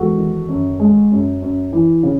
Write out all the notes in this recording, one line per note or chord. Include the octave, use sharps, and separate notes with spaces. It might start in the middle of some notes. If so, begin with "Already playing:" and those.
Already playing: E2 G#3 F#4 A4
D#3
F#2
G#3
F#2
F#2
E3
C#3